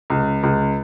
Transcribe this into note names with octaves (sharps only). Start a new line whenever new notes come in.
C#2
C#2